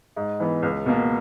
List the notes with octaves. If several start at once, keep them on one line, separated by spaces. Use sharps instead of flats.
G#2
E3 B3
C#2
B2 A#3